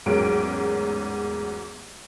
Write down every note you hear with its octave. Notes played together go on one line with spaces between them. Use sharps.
A1 E2 G#2 F#3 A#4 D7